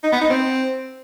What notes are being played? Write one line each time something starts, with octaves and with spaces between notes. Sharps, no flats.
D#4
B3
D#4
C4